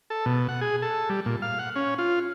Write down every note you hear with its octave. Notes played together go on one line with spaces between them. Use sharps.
A4
B2
F#5
G#4
A4
G3
A#2
F5
F#5
C#4
F4